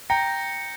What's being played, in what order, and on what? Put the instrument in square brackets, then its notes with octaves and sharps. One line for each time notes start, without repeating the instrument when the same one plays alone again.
[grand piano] G5 A#5 [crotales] G6 A#6 C#7